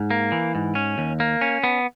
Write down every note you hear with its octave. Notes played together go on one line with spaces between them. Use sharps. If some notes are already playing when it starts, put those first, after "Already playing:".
Already playing: G#2
A#3
E3
G#2
C#4
D#2
A#3
C#4
B3